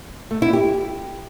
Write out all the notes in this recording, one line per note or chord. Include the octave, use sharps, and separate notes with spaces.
A3
E4
G4